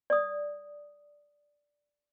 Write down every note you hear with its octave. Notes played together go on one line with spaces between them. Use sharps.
D5 D#6